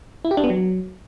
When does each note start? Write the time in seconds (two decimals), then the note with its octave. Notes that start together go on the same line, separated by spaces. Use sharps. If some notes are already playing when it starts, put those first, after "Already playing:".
0.25 E4
0.31 G4
0.37 D4
0.44 B3
0.50 F#3